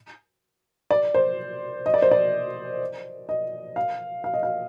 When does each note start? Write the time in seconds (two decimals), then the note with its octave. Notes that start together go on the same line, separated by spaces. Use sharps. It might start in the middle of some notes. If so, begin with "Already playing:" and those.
0.90 D5
1.14 C5
1.86 D#5
1.94 D5
2.02 C5
2.11 D5
3.29 D#5
3.76 F5
4.24 F5
4.34 D#5
4.43 F5